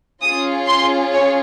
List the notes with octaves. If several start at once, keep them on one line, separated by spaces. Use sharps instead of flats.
C#4 F4 G#4 D#6
C6
C#5